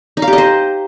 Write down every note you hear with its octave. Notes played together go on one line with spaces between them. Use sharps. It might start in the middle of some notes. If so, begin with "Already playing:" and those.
D#4
F5
G4
D#5
C5